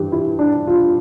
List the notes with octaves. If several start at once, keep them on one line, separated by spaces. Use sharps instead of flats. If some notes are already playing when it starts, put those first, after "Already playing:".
Already playing: G2 E3 G4
E4
D4
F4